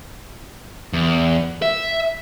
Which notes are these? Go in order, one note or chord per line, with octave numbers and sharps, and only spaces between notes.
E2
E5